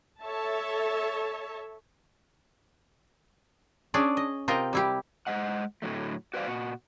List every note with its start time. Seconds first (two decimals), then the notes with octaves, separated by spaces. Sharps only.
0.23 A4 C#5 E5 A5
3.94 C#4 D4 G#4 D5
4.17 D#5
4.48 C3 F4 A#4 D#5 G5
4.73 G3 E4 G4
5.27 G#3 C5 D#5 F#5
5.82 A2 D3 F#3 A3
6.34 F#4 B4 C5 D5 F5
6.47 A#2 F#4